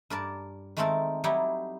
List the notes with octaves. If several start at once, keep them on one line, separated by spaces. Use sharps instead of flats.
G2 A#4 D5 A5
D#3 G#3 A3 C4 A4 A#4
F#3 G3 D#4 E4 G4